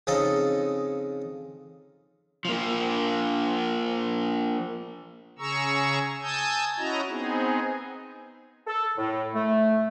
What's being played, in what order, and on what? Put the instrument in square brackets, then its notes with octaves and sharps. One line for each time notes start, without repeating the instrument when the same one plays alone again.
[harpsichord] F2 C#3 D#4 A4 D#5
[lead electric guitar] F3 A#3
[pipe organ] C#3 G#4 A#5 C#6 E6
G#5 A5 D#6 E6 G6
C#4 E4 F#4 D#5 A#5
B3 C4 D#4 G#4
[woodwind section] A4
A2
A3